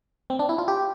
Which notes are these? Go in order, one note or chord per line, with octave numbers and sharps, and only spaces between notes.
C4
D4
E4
F4
G4